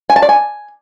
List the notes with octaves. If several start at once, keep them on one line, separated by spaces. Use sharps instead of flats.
G#5
A5
D5
G#5